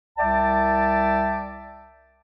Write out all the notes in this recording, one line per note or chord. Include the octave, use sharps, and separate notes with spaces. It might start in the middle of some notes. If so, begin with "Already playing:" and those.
C2 D5 E5 G5 A5